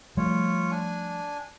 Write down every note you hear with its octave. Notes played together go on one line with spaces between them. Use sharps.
F3 G3 A3 F4 C#5
D4 G#5